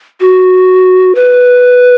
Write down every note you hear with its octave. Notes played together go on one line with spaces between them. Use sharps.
F#4
B4